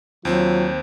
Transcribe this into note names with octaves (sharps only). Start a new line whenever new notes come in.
D#2 F#3 C4 F4 C5